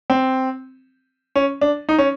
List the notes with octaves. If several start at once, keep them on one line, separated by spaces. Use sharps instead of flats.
C4
C#4
D4
D#4
C#4